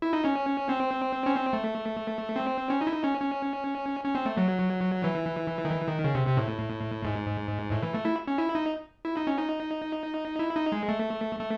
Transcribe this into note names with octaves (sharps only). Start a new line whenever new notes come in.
E4
D#4
C#4
C4
C#4
C4
A3
C4
C#4
D#4
E4
D#4
C#4
C#4
C#4
C4
A3
F#3
E3
D#3
E3
D#3
C#3
C3
C3
A2
G#2
A2
E3
A3
E4
C#4
E4
D#4
E4
D#4
C#4
D#4
E4
D#4
G#3
A3
A3